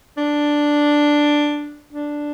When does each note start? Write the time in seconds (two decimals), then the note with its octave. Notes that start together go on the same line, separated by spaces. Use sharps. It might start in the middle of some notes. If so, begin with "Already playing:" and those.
0.17 D4
1.93 D4